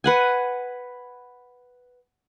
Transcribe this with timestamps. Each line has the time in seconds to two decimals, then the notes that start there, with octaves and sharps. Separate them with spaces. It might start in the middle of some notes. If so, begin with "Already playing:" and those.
0.04 B4 F#5 G#5